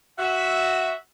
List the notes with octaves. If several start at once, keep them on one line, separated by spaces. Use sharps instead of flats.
F#4 E5